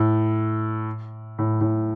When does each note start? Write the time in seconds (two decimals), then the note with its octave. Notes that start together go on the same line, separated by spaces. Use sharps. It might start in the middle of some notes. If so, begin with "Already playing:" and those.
Already playing: A2
1.39 A2
1.61 A2